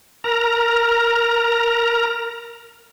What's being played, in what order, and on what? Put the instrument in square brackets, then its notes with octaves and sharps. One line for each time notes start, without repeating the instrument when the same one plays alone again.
[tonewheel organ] A#4 A#5